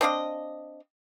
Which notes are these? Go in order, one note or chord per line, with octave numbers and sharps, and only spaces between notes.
C4 D4 D#5 F5